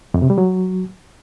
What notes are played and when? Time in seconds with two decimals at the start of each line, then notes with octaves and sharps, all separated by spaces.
0.14 F2
0.22 C3
0.30 G3
0.38 F#3